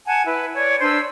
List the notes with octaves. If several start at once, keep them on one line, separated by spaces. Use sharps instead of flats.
F#5 G#5 A5 G#6
E4 B4
C#5 D5
D4 B4 C5 E6